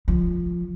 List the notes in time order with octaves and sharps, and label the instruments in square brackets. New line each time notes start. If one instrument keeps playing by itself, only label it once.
[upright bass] F3